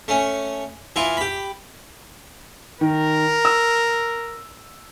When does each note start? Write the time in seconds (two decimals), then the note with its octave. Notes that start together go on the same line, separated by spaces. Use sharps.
0.08 A3 C#4
0.96 E3 E4 F4
1.17 G4 B5
2.81 D#3 A#4
3.45 E6